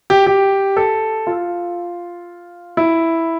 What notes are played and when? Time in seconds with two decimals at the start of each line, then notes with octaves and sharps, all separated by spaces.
0.10 G4
0.26 G4
0.77 A4
1.27 F4
2.77 E4